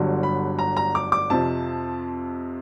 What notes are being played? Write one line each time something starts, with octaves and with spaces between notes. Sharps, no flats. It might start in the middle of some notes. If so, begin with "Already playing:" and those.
Already playing: G1 G2 D3 F#3
B5
A#5
A#5
D6
D6
F2 C3 F3 A5